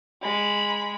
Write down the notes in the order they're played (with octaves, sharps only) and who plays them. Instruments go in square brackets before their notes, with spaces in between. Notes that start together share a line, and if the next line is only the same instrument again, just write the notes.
[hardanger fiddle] G#3 B5